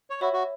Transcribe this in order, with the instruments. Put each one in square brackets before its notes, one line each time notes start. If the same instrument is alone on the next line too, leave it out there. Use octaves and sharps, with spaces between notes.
[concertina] C#5
[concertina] F#4 [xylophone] C#5 E5 B5 E6
[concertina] F#4